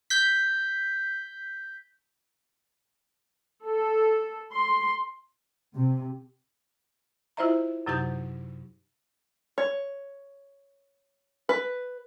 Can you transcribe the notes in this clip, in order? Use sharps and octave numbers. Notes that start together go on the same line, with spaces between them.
G6 B6
A4
C6
C3
E4 F4 C5 D#5 E5 A#5
F#2 C3 F#3 D#4 G4 G6
C#5
B4